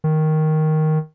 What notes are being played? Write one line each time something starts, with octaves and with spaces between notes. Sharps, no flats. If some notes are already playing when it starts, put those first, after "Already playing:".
D#3